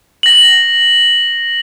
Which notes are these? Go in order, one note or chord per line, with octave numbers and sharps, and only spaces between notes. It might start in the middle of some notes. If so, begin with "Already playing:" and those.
A#6 F#7